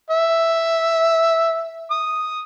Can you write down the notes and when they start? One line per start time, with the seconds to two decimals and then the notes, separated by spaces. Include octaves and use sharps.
0.11 E5
1.91 D#6